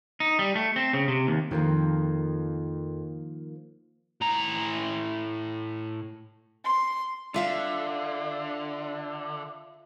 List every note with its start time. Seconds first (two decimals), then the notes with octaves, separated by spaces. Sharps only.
0.20 D#4
0.39 G3
0.55 A3
0.76 C4
0.93 C#3
1.08 C3
1.27 D#2
1.51 F2 D#3 F3 A#3
4.21 A2 A#5
6.65 C6
7.34 D3 F4 E5 F5